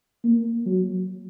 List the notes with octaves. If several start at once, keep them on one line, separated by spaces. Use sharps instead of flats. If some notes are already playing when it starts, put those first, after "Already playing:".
A#3
F#3